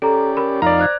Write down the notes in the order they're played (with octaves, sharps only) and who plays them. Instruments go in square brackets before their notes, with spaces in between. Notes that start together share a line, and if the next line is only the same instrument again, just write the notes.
[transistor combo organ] C#4 G4 D5 [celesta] A4 A#5
[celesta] A#4 B5
[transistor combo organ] F2 D#4 F5 [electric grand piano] D5 A#5
[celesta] C5 F#6 G#6